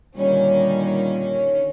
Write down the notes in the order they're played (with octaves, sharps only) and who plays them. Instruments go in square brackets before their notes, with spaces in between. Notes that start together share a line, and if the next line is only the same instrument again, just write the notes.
[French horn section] A#2 G3 [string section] D3 D#3 C#4